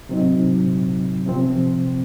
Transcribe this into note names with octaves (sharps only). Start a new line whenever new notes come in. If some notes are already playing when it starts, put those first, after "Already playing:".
C3 F#3 C4 D#4
C3 F3 C4